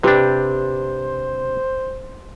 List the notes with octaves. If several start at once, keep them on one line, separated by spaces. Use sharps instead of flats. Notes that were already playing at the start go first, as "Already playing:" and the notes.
C3 D4 G4 B4 C5